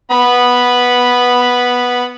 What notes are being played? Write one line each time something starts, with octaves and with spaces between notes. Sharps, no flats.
B3 B5